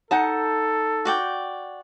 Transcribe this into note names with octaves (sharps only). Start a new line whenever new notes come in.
D#4 A4 F#5 A5
F#4 D5 G5